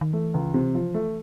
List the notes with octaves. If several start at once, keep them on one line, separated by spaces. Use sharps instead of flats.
D#3
E3 A3
C#2
C3
F3
A3